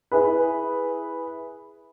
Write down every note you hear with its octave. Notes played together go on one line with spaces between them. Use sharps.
E4 G#4 B4